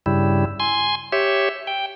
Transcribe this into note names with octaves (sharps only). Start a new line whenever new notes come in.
G2 C#3 G3 E4
G#5 C6
G4 C#5 E5
G5